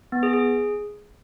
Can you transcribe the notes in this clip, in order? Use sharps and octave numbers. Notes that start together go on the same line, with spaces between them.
B3
G#4
G#4